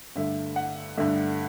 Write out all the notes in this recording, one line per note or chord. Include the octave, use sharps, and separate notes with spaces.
G2 D3 A3 E5
F#5
G2 D3 A3 E5